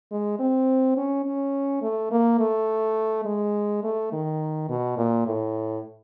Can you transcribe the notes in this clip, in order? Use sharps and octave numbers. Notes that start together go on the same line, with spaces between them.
G#3
C4
C#4
C#4
A3
A#3
A3
G#3
A3
D#3
B2
A#2
A2